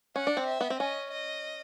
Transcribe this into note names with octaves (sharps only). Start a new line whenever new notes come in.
C#4 F#5
D4
C4
E5
B3
C4
C#4 D#5
D#5